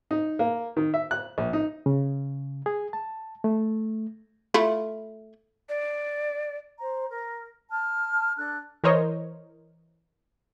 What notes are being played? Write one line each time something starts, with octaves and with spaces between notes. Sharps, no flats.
D#4
A#3
D#3
E5
F#6
A#1
D#4
C#3
G#4
A5
A3
A3 E4 F4
D5
C5 A#5
A#4
A5 F6
D4 A4 F#6
E3 A#4 C5 C#5 D#5